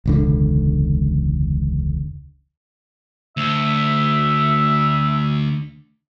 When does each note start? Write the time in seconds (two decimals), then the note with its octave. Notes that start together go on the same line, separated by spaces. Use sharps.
0.06 E1 C#2 D3
3.37 D2 E5